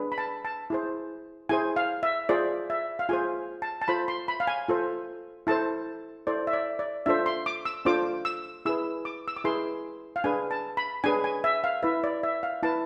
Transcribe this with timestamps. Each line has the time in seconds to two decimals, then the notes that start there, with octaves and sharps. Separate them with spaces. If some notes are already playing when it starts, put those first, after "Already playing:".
Already playing: D4 G#4 B4
0.12 B5
0.18 A5
0.45 A5
0.70 E4 G#4 C5
1.49 E4 G#4 C5 G#5
1.76 F5
2.03 E5
2.29 F4 G#4 C5 D5
2.70 E5
2.99 F5
3.09 F4 G#4 C5 G#5
3.62 A5
3.82 A5
3.88 F4 A4 C5 B5
4.08 C6
4.28 B5
4.40 F5
4.47 G#5
4.69 F4 A4 C5
5.47 E4 A4 C5 A5
6.27 E4 A4 C5 D5
6.47 E5
6.53 D5
6.79 D5
7.06 D4 F4 A4 C5 E5
7.26 C6
7.46 D6
7.65 E6
7.85 D4 F4 A4 C5 D6
8.25 E6
8.65 E4 G#4 B4 E6
9.05 D6
9.28 E6
9.37 D6
9.44 E4 G#4 B4 C6
10.16 F5
10.24 D4 G#4 B4 G#5
10.51 A5
10.77 B5
11.04 D4 G#4 B4 G#5
11.24 G#5
11.44 E5
11.64 F5
11.83 E4 B4 E5
12.04 D5
12.23 E5
12.43 F5
12.63 E4 B4 A5